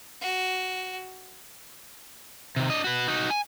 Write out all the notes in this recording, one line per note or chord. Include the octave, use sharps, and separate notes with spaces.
F#4
C3 D#3
D4 D#5
F#4 B4
D#4 F#4
G#5